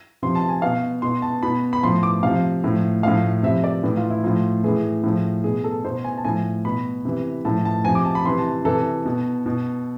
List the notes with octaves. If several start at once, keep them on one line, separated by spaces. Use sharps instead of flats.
C3 F3 C6
A5
G#5
B2 F5
B2 C6
A5
B2 B5
B5
A2 F3 C6
D6
C3 F3 F5
A2 F3
A2 F3 F5
C3 F3 E5
D5
A2 E3
F4
E4
A2 F3 F4
A2 E3 G#4
A2 F3
B2 G#4
A4
B2 C5
G#5
A5
A2 F3 G#5
B2 B5
C3 E3
A2 F3 A5
A5
C3 F3 G#5
D6
A5
B5
C3 E3 C6
A5
C3 E3 A4
B2
B2